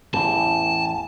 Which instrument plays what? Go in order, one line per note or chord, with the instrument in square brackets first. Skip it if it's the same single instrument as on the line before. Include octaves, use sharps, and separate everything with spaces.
[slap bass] A1 E2 [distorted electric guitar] A5